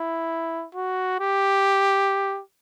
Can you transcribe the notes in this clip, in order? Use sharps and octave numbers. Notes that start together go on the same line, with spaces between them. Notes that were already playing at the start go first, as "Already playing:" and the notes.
Already playing: E4
F#4
G4